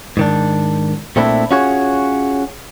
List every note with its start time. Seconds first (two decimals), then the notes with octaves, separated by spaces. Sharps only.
0.17 G#2 D#3 D4
1.16 A#2 A3 C4 D4 E4
1.51 C#4 F4 F#4 G#4 C#5